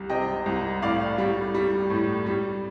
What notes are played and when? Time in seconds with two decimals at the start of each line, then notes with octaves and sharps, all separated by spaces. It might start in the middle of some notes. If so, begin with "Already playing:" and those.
Already playing: C2 G3
0.10 C3 D#5 G5
0.46 C2
0.82 A2 D5 F5
1.18 G3
1.54 G3
1.90 A2
2.26 G3